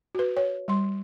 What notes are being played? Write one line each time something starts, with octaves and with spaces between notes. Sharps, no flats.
F#4 B4
C#5
G3 C6